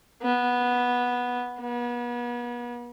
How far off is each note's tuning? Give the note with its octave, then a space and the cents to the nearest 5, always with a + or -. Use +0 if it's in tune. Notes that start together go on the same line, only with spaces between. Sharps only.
B3 -10
B3 -35